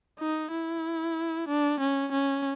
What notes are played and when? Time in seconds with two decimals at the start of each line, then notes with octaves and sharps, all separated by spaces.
0.20 D#4
0.52 E4
1.48 D4
1.80 C#4
2.12 C#4